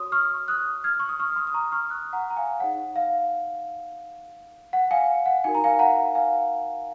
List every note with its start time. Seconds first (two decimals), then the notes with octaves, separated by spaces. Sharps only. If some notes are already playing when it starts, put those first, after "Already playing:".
Already playing: F#4 C#5 C6 D#6
0.12 C#6 F6
0.48 D#6 F#6
0.84 F6 G#6
1.00 C#6
1.09 D#6
1.20 C#6 F6
1.32 F6
1.36 C6 D#6
1.47 D#6
1.54 A#5 C#6
1.72 C#6 F6
1.89 D#6 F#6
2.13 F#5 A#5
2.30 A#5
2.37 F5 G#5
2.60 D#4 G#4 C#5 F#5
2.96 F5
4.73 F#5
4.91 F5 G#5
5.26 F#5
5.44 D#4 F#4 A#4 G#5
5.55 A#5
5.64 F5 G#5
5.79 F#5 A#5
6.15 F5 G#5